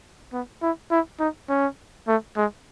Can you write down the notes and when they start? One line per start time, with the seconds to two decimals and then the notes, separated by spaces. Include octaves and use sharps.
0.32 B3
0.62 E4
0.91 E4
1.19 D#4
1.49 C#4
2.07 A3
2.37 G#3